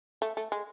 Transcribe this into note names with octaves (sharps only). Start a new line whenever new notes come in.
A3
A3
G#3